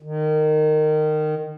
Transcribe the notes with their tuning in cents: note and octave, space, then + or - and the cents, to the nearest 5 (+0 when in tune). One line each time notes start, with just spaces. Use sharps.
D#3 -20